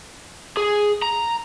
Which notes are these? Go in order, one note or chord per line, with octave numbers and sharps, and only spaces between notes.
G#4
A#5